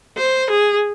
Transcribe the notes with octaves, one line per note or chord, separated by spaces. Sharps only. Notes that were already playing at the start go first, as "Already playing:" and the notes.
C5
G#4